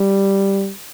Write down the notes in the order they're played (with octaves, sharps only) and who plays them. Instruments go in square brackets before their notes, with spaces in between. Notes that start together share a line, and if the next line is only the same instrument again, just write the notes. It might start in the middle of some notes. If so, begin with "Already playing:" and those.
Already playing: [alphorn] G3